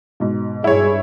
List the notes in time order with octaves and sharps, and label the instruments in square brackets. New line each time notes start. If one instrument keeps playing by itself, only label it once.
[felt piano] G#2 B2
[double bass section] G2 [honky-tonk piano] E4 C#5 [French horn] G#4